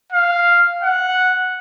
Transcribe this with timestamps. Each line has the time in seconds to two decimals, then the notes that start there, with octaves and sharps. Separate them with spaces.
0.12 F5
0.83 F#5